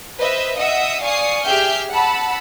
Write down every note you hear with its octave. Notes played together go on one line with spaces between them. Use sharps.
B4 C5 D#5 E5
D#5 E5 F#5 D#6 E6
D5 F5 G#5 C#6 D#6 C7
G4 G#4 E5 G5 F6 G6
F#5 A5 B5 E6